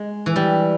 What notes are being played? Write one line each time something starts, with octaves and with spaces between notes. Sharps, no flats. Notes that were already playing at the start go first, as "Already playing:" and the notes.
Already playing: G#3
E3
G3